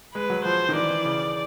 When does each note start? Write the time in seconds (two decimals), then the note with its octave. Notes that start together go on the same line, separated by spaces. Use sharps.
0.15 G#3 B4
0.30 F#3
0.45 F3 C5
0.69 D#3
0.76 E3 D5
0.90 E3
1.05 C#3